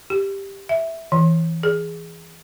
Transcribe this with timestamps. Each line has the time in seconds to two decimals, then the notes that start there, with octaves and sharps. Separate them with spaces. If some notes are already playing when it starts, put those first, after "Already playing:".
0.10 G4
0.69 E5
1.12 E3
1.63 G#4